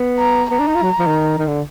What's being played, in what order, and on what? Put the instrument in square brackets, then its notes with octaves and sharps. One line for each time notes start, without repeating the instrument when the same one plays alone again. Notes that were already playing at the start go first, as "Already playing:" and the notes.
Already playing: [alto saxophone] B3
[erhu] A#5
[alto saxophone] B3 [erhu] A#5
[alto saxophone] D4
D#4
F4
F#3
F3
D#3
D#3
D3